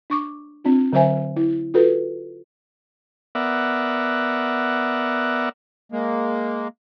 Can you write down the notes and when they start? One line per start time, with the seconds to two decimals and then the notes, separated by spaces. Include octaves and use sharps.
0.10 D4 C#6 D6
0.64 C4 D4 F4
0.93 D3 F#3 A#4 C5 E5 G#5
1.36 E4
1.74 F4 F#4 A4 B4
3.35 B3 A#4 D5 E5 F#5
5.92 G#3 A#3